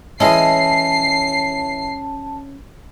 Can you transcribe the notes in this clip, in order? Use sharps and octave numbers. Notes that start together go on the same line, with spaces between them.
E3 G#3 C#4 E4 D#5 A5 C7